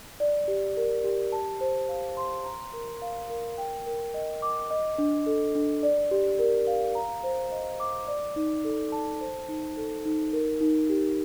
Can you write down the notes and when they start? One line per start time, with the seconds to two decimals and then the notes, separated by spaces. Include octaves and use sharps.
0.20 D5
0.48 G4
0.77 A#4
1.04 G4
1.32 A5
1.61 C5
1.89 F5
2.17 C6
2.45 A#5
2.73 A#4
3.02 F5
3.30 A#4
3.58 G5
3.86 A#4
4.14 D#5
4.42 D6
4.71 D#5
4.98 D4
5.26 A4
5.55 D4
5.83 D5
6.11 G4
6.39 A#4
6.67 F5
6.95 A#5
7.24 C5
7.51 D#5
7.80 D6
8.07 D5
8.36 D#4
8.64 A4
8.92 A5
9.21 C5
9.48 D#4
9.77 A4
10.05 D#4
10.33 A#4
10.61 D#4
10.90 G4